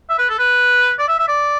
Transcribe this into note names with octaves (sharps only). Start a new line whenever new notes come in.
E5
B4
A4
B4
D5
E5
E5
D5